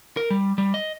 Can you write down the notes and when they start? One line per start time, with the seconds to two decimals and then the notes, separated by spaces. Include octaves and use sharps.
0.17 A#4
0.30 G3
0.58 G3
0.74 D#5